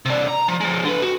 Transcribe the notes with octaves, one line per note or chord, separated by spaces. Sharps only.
C3 D4
A#5
F3
F3 G#3
D3 B4
F#4